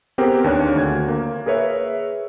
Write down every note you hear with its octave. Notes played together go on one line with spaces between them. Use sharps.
B3 C4 G4 G#4 A#4 B4
D#2 D4 C#5 F#6
D2 G#6
A#3
G#4 A#4 B4 C#5 E5